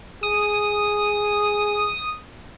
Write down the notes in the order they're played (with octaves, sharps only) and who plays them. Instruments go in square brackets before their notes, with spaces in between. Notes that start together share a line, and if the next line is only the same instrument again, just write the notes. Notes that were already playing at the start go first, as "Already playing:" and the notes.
[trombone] G#4 [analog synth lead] D#6